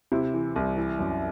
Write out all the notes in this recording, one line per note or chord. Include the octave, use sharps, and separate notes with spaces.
C3 E4
E3
C2
E3
F#2